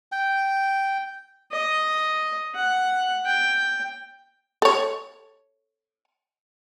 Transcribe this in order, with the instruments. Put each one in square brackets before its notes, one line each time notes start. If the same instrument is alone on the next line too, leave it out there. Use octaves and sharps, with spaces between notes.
[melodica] G5
[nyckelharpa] D#5
F#5
G5
[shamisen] A4 C#5